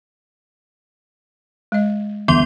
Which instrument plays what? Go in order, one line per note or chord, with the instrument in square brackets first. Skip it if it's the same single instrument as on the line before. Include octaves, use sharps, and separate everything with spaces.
[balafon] G#3 D#5
[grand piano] G1 D2 [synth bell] B3 C6 G7